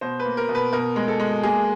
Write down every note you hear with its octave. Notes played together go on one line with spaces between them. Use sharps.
B2 C5
B4
A#3
A#4
B2
B4
B2 A#4
G#3
A4
G#3
A#3 G#4